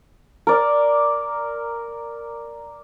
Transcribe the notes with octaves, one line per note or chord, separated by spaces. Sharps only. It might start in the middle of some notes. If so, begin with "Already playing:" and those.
A#4 D5